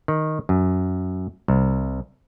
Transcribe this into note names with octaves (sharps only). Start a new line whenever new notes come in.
D#3
F#2
C2